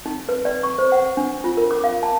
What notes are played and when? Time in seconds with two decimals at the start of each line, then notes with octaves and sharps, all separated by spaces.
0.06 D#4
0.29 B4
0.45 D5
0.63 C#6
0.79 C5
0.92 F#5
1.17 D4
1.44 F4
1.57 A#4
1.71 D6
1.84 F5
2.03 A5